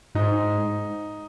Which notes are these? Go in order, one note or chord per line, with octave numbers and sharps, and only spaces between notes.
G#2 D#4